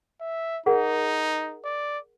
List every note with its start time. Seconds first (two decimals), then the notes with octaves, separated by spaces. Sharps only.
0.21 E5
0.66 D#4 G#4 A#4 F#5
1.65 D5